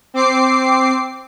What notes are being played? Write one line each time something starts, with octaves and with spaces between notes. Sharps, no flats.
C4 D6 C7